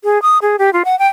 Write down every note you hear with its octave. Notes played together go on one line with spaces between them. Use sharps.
G#4
D#6
G#4
G4
F4
F#5
G5